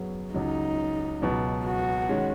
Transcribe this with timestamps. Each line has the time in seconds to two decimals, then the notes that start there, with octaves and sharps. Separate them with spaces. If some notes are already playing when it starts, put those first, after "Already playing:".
Already playing: F#2 F#3 B3 G#4
0.34 C#2 C#3 F#3 D#4
1.22 C#2 B2 F#3
1.66 F#4
2.09 D#3 G#3 C#4